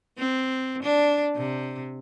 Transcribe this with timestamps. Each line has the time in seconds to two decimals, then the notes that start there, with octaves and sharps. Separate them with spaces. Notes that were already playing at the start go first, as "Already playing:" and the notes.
0.18 C4
0.83 D4
1.35 C3